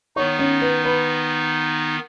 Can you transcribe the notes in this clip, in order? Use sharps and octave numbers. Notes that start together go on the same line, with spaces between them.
D#3 B3 D#4 C#5 C#6
C#4 C#5
B4
B4 B5